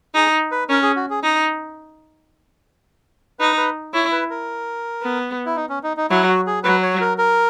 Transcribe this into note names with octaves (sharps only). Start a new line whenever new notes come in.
D#4 G#4
B4
C#4 A#4
G#4
F#4
G#4
D#4
D#4 B4
B4
E4 C#5
B4
A#4
B3
E4
D#4
C#4
D#4
D#4
F#3 E4
F#4
G#4
F#3 B4
C#5
A#4
A#4